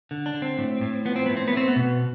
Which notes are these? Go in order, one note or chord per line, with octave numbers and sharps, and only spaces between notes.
D3
D4
D3
C4
A2
A2
F3 B3
C4
A2 B3
C4
B3
A3 C4
B3
B2